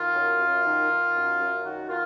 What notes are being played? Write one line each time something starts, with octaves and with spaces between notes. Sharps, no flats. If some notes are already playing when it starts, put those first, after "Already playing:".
Already playing: D#3 F4
F#2
F#2
D#3
D#3
F#2
F#2
D#3 F#4
D#3 F4